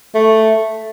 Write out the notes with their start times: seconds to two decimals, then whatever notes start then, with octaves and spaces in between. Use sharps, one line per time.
0.15 A3